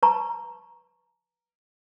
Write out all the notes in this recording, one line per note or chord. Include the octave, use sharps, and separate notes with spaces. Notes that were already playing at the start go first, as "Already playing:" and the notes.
B4 A5 A#5 C#6